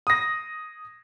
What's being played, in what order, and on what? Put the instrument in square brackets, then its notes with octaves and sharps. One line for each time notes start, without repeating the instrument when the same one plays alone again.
[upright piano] D#6 A#6